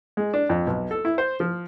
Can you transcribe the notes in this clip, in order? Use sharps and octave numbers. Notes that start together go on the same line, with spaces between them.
G#3
D4
F2
B1
A4
E4
C5
F3